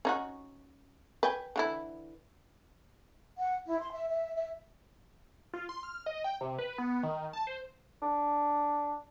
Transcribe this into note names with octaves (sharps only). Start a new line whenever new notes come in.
C#4 D#4 F#4
B4 G5 G#5
D3 E3 E4
F#5
E4
C6
E5
E5
E5
F4
C6
F6
D#5
G5
C3
B4
B3
D#3
A5
C5
D4